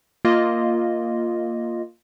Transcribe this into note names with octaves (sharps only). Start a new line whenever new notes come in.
A#3 F4 D#5